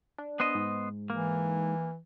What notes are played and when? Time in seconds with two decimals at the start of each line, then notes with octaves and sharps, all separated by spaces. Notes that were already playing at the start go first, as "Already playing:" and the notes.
0.18 D4
0.40 B3 C5 D#5
0.55 G#2
1.10 E3 A#3